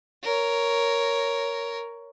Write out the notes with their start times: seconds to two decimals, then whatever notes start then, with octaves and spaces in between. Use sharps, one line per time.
0.23 A#4 C#5